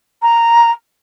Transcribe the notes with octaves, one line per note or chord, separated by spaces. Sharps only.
A#5